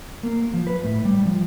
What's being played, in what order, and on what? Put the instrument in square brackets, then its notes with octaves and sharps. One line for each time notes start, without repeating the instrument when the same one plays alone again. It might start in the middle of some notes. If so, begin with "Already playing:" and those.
[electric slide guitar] A#3
F3
B4
A2
G3
F3